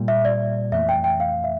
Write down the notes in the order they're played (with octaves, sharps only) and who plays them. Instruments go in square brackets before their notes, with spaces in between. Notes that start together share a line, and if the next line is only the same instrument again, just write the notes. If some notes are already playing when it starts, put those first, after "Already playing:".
Already playing: [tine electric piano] A#2 G3 A#3
[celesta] E5
D5
[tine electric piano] F2 E3 A3 [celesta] E5
[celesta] G5
G5
F5
E5